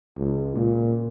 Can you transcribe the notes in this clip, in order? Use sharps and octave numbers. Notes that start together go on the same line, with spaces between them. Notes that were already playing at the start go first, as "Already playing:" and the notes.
C#2
A#2